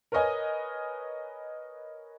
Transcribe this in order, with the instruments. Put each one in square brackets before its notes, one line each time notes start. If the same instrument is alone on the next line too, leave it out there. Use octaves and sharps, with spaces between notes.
[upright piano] A#4 B4 C#5 D#5 G#5